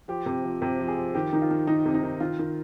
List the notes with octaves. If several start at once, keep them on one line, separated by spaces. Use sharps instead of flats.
F3 G4
C3
F3
C3 G4
F3
G#4
F3
D#3 G4
D#3 D#4
F4
D#3
D#3 D#4
C3
D#4
D#3
D#3 F4
D#3